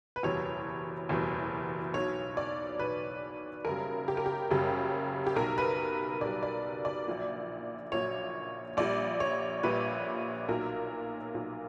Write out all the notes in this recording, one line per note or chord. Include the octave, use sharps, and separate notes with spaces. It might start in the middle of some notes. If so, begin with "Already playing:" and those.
B4
F#1 E2 B2 G3 C#5
F#1 E2 B2 G3
B1 B2 F#3 C#5
D5
B1 B2 F#3 B4
F#1 F#2 C#3 G3 A#4
G4
A#4
G4
F#1 F#2 C#3 G3 G4
G4
B1 B2 G3 A#4
B4
B1 B2 G3 D5
D5
D5
A#1 A#2 F#3
A#1 A#2 F#3 C#5
A#1 A#2 G3 D5
C#5
A#1 A#2 G3 B4
B1 A#2 F#3 A#4
B1 A#2 F#3